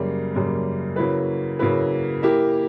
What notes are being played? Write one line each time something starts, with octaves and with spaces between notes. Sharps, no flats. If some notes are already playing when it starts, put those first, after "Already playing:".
Already playing: F#2 C#3 G3 A#3
F#2 C#3 G3 A#3
C#3 F#3 A#3 E4 B4
C#3 F#3 A#3 E4 B4
A#3 E4 G4 A#4